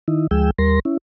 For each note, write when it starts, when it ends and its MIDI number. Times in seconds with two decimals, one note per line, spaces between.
0.08 0.27 51
0.08 0.27 63
0.08 0.27 64
0.31 0.50 38
0.31 0.50 53
0.31 0.50 56
0.31 0.50 68
0.31 0.50 79
0.31 0.50 88
0.58 0.79 39
0.58 0.79 55
0.58 0.79 70
0.58 0.79 84
0.58 0.79 94
0.85 0.97 61
0.85 0.97 64